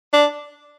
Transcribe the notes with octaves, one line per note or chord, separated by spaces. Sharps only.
D4